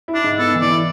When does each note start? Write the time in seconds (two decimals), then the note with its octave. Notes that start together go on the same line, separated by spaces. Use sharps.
0.08 E4
0.15 D4
0.23 G#2
0.38 B3 A4
0.55 E3
0.61 D5
0.70 E4